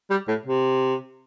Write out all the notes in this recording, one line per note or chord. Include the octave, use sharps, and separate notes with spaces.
G3
A2
C3